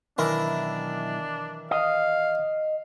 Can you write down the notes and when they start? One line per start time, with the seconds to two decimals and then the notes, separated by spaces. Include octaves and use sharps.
0.18 B1 D#3 E3 D4 E4 A#4
1.71 D#5 F5